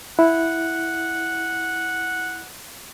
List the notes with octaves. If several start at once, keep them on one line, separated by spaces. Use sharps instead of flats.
E4 F#5